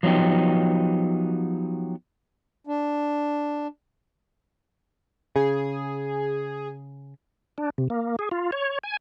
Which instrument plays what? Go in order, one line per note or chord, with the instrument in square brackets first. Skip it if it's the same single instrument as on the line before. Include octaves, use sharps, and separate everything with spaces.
[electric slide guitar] F3 F#3 B3 D#4 G4
[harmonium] D4
[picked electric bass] C#3 [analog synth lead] G#4
[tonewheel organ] D4
C3
A#3
G#4
F4
C#5
G#5